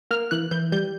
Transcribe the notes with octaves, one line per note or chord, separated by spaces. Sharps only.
A#3 F6
E3 F#6
E3 G6
G3 G6